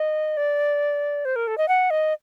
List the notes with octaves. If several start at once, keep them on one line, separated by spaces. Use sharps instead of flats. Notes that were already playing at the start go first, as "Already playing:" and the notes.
Already playing: D#5
D5
C5
A#4
A4
D#5
F#5
D#5